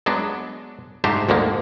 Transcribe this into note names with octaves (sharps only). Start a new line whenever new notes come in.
F#3 G#3 B3 D4
G#2 A3 D4 G4 C5 A#5
D2 G#2 D3 D#3 A#3